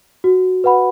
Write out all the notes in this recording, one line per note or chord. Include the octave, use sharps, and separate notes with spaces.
F#4
B4 F#5 B5